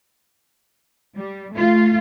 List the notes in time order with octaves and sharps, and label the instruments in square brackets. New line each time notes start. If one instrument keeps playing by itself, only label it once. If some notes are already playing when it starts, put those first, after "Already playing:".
[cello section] G3
A3 F4